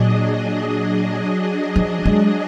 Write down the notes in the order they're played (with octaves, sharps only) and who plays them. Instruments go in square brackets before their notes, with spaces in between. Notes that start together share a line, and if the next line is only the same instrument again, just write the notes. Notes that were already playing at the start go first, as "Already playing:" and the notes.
Already playing: [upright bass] A#2 [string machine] F#3 D4 G#4 D#5
[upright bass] F3
G#3